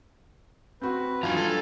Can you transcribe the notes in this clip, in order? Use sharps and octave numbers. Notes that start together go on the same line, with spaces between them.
C4 F#4 B4
F2 D#3 F#3 D4 F4 F5 G#5 A#5
G3 A4